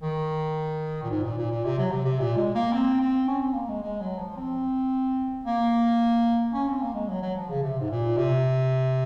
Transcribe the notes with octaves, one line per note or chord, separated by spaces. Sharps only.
D#3
A#2
G#2
A#2
A#2
A#2
C3
F#3
C3
C3
A#2
G#3
A#3
C4
C4
C#4
C4
A#3
G#3
G#3
F#3
F3
C4
A#3
C#4
C4
A#3
G#3
F#3
F#3
F3
C#3
C3
G#2
A#2
C3